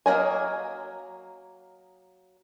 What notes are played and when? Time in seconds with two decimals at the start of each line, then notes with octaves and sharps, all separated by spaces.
0.06 F#3 A#3 G#4 D#5 G#5